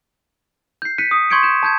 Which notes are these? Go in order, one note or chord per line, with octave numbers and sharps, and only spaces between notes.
G6 C7
F#6 B6 C#7 D#7
D#6
C6 C#6 G6 G#6 C#7 D7
G6 E7
A5 G6 G#6